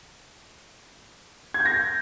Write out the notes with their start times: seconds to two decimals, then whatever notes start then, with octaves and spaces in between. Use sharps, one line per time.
1.54 G#6
1.60 G6
1.66 A#6